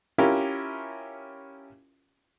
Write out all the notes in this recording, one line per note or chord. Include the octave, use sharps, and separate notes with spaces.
C#4 E4 F4 G4 A#4